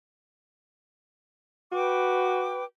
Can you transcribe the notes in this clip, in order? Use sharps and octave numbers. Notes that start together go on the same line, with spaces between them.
F#4 B4 G5 D6